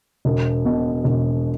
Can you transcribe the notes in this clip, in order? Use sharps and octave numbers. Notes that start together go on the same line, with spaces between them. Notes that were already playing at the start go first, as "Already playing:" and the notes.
E1
B2
E1